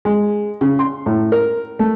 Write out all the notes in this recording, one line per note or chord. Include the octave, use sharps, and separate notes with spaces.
G#3
C#3
C6
A2
A#4
A3